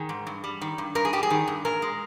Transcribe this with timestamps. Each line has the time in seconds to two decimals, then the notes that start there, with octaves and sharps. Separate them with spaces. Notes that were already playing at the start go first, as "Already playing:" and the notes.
Already playing: D#3 G#4
0.09 G#2
0.27 G2
0.44 G3
0.61 D#3
0.78 G2
0.95 G2 A#4
1.05 G#4
1.13 G3 G4
1.23 G#4
1.30 D#3
1.47 G2
1.65 A#2 A#4
1.82 G#3